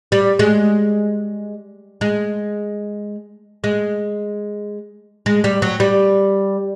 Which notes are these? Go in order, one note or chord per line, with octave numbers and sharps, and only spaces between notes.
G3
G#3
G#3
G#3
G#3
G3
F#3
G3